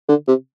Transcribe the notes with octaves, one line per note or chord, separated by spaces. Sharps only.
D3
C3